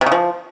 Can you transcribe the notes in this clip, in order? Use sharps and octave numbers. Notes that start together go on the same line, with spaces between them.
C3
C#3
F3